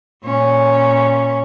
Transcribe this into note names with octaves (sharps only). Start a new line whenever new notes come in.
A#2 C#4